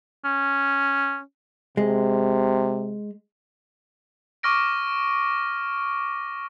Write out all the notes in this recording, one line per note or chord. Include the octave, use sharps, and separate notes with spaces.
C#4
C3 G#3
C#6 D6 F6 A#6 D7